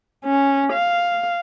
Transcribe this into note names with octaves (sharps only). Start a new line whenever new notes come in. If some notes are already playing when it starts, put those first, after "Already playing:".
C#4
F5